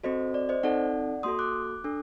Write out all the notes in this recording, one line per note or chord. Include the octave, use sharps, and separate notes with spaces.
C4 F#4 A4 C5 D#5
D5
C5 D#5
C4 D#4 A4 D5 F#5
A#3 F#4 A4 C6 D#6
D6 F#6
D4 A4